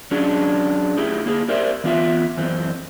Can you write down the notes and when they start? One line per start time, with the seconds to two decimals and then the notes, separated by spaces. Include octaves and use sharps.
0.11 F#3 C#4 D4 G#4
0.97 A3 E4 G4 G#4
1.26 A#3 E4 G#4
1.48 G4 A#4 C5 D5 E5
1.84 E3 B3 F4 D#5 E5
2.37 F#2 E3 C4